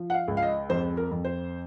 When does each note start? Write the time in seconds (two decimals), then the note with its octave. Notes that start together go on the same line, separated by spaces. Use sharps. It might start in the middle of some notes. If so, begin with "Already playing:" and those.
Already playing: F3
0.10 F#5
0.14 F5
0.28 C#2
0.37 F5
0.43 D#5
0.69 F2 C5
0.97 A#4
1.11 F2
1.25 C5